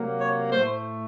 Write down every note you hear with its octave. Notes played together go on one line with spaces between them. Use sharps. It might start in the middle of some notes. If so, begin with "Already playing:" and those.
Already playing: C3 F#3 A#3
C#5
A2 A3 C5